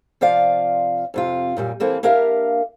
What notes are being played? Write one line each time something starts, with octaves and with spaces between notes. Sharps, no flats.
C3 F3 F4 D5 F5
F2 C3 F4
F#2 A#2 G3
E3 A#3 C4 A4
A#3 D4 G4 A#4 E5 F5